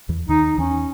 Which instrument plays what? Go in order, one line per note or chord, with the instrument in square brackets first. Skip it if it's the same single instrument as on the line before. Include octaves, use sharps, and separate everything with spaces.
[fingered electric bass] E2 E3
[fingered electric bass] D#2 D#3 [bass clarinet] D#4
[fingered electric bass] E2 E3 [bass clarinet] C#4